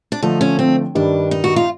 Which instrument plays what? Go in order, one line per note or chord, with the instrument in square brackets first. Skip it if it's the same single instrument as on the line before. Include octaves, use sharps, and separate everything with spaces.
[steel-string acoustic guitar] D4
[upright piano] D3 F3 A3 D4 [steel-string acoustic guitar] D#4
[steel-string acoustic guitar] C#4
C4
[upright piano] G2 D#3 G3 [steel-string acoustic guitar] D4
[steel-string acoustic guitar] D#4
F#4
F4